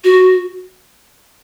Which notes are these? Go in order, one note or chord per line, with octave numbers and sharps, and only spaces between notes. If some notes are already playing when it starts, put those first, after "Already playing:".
F#4